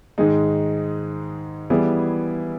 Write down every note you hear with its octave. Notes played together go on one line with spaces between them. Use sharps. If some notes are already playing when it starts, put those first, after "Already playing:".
G#2 D#3 G#3 D#4
E3 G3 B3 E4 G#4